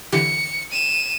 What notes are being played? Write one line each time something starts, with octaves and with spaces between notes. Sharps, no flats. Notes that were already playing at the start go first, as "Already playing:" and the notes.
D3 E3 G4 C#7
D#7 E7